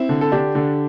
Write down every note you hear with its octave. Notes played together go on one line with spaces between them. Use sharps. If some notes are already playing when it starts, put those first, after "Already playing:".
Already playing: C4 E4
D3
A4
D3 D4 G4
D3